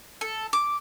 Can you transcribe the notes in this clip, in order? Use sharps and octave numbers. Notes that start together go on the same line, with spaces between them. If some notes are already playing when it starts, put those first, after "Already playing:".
A4
D6